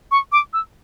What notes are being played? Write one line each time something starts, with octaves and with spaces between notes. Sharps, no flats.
C#6
D6
E6